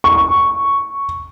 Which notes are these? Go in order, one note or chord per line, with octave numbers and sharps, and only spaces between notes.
C#6